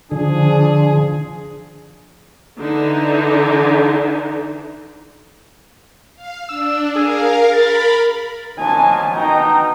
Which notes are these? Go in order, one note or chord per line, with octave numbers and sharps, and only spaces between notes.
D3 F3 D4 G#4
D3 E3 D#4
F5
D4 E6
G#4 A#4 F5
A#4 B5 A6
F#2 F3 D#4 G#5 A5
B2 D#4 G5 A#5